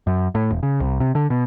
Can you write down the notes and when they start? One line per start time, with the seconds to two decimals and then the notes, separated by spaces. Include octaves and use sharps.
0.07 F#2
0.35 A2
0.51 E1
0.63 C#3
0.80 C2
1.00 C3
1.15 D3
1.30 B2